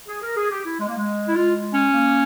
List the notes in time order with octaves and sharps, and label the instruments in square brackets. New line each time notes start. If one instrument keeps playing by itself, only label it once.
[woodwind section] G#4
A#4
G#4
G4
E4
G#3
A#3
G#3
[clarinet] E4
[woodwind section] G#3 [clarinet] F4
[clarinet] C#4
[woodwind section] A#3